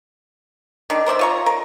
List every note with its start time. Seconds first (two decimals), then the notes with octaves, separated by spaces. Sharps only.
0.90 D#3 D4
1.06 A#4 C5 D5 E5
1.19 F4 C#5 A#5
1.46 A#4